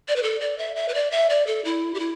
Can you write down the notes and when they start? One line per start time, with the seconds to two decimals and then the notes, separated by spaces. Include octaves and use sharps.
0.08 D5
0.16 B4
0.23 A4
0.41 D5
0.58 E5
0.76 E5
0.88 B4
0.94 D5
1.11 E5
1.30 D5
1.47 A4
1.65 E4
1.94 G4
1.99 E4